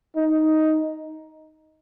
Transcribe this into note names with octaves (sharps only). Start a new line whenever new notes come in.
D#4